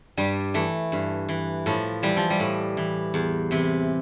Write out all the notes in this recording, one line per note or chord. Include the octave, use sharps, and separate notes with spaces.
G2 G3
E3 A3
G2
E3
A2 F3
E3 G3
F3
G3
A2
E3
E2
C3 E3